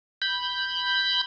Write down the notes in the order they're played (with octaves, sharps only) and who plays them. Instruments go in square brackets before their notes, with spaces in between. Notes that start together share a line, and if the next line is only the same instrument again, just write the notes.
[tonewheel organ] B5 G6